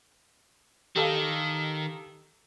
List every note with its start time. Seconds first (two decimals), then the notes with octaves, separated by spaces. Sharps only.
0.96 D#3 G4 A4 F5